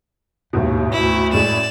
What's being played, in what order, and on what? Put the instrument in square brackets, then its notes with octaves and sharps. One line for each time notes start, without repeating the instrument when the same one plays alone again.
[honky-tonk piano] A1 G#2 B2 [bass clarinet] D#2
[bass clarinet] D2 [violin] E4
[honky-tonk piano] F#2 A2 G#3 [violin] D5 E7